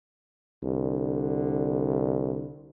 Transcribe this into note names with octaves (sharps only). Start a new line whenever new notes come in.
C2 D3